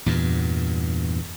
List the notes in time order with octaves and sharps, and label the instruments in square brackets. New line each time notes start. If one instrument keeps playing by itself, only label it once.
[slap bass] E2 G2 A#2